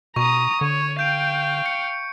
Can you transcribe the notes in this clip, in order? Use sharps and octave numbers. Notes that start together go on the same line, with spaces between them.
B2 A#5 C#6 D#6
D3 C#5
F5 G5 G6 D7
C#7